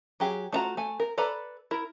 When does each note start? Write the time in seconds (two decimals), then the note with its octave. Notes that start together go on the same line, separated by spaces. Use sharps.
0.20 F#3 G4 G#4
0.52 A3 D4 F4 F#4 A#5
0.77 A3 G#5
1.00 A#4
1.18 A4 B4 D5 A#5 B5
1.71 E4 A#4